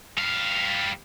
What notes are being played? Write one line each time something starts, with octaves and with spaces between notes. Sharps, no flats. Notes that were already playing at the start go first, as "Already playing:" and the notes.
G3 F5